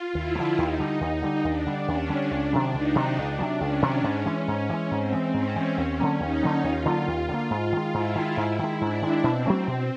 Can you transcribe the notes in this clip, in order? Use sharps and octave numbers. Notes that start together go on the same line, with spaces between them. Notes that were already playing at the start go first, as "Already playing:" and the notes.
Already playing: F4
D#2 E4
A3
D3 F3
D#2 D#4
D3 G3
D#2
D3 G3
D#2 D4
D3 G3
D#2 C#4
D3 G3
C#2 D4
C3 D#3 F#3
C#2 D#4
C3 D#3 F#3
C#2 D4
C3 D#3 F#3
C#2 C#4
C3 D#3 F#3
G#2 C#4
E3 G#3
G#2
E3 G#3
G#2 C4
E3 G#3
G#2 C#4
E3 G#3
D#2
D3 F#3 A#3
D#2 D#4
D3 F#3 A#3
D#2 F4
D3 F#3 A#3
D#2 F4
D3 F#3
A#3
G#2
D#3 G#3
G#2 E4
D#3 G#3
G#2
D#3 G#3
G#2 D4
D#3 G#3
B2 C4
F#3 A3 C#4
B2